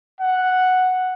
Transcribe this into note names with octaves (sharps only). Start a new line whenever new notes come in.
F#5